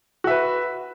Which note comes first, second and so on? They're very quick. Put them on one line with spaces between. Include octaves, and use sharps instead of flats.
F#4 E5 B4